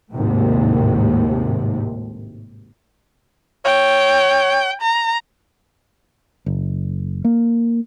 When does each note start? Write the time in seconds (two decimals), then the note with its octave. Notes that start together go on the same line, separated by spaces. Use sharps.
0.11 G#1 D#2 A2 C3
3.65 C#5 G5
4.81 A#5
6.46 F#1
7.25 A#3